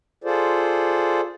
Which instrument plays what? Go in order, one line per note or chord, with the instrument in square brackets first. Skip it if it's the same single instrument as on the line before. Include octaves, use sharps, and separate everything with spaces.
[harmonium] F4 G#4 A4 C5 D5